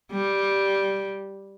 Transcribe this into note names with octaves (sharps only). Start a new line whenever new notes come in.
G3